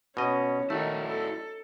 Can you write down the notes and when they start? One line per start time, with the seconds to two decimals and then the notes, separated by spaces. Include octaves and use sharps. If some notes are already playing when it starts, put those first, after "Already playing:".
0.17 B2 C#4 D#5
0.70 D#3 A3 E4 F#4 D#5
1.06 A4